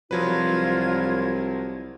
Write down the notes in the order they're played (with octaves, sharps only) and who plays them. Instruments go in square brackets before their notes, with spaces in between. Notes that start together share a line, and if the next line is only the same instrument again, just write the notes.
[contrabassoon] C2 [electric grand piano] F3 F#3 B4 [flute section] F4 G#6